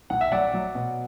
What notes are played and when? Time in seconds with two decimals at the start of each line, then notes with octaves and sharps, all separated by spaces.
0.10 B1 F#5
0.21 E5
0.32 F#3 D5 F#5
0.54 F#3
0.75 B2